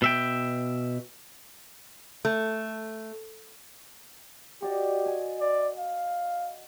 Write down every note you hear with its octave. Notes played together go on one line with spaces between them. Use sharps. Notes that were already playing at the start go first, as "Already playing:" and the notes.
B2 E5 G5
A3
F#4 G4 D5 D#5
G#5
D5
F5